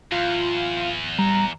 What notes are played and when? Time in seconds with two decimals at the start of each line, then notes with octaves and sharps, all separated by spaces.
0.12 D1 E2 F4
1.18 G3 A#5